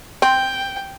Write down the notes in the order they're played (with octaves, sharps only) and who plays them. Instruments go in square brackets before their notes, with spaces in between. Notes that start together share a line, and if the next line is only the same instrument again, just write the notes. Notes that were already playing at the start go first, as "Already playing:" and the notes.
[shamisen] C4 [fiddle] G5